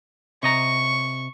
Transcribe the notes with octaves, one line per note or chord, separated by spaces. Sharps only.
C3 D#5 A#5 C#6